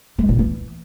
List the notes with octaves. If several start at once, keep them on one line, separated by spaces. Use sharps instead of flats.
G#3
A#2
E3